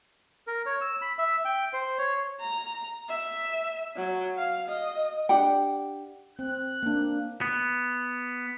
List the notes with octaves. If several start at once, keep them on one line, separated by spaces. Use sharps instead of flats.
A#4
C#5
E6
B5
E5
G5
C5
C#5
A#5
E5
F#3
F5
D#5
D4 G4 F#5 G5
C4 F#6
A#3 D4
B3